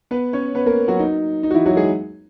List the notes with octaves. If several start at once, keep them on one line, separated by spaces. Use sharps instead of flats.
B3 B4
C#4 C#5
B3 B4
A#3 A#4
F#3 F#4
D#4
D#4
F#4
E3 E4
F#3 F#4
G#3 G#4